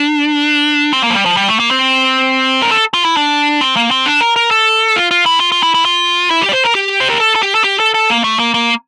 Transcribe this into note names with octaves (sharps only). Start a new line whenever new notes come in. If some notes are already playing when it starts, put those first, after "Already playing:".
Already playing: D4
C4
A#3
F3
G3
F3
G3
A3
A#3
C4
A#4
A4
F4
E4
D4
C4
A#3
C4
D4
A#4
A#4
A4
F4
F4
E4
F4
F4
E4
E4
F4
E4
G4
D5
C5
A#4
G4
C5
A#4
A4
A4
G4
A4
G4
A4
A4
A#3
A3
A#3
A#3